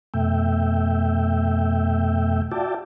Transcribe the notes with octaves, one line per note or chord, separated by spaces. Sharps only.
F2 B2 A3 E5 G5
F4 F#4 D5 E5 G5 A5